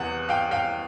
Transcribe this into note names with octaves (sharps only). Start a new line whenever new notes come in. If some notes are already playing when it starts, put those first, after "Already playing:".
Already playing: E2 C3 B3 F#5
F5 G5
F5 G5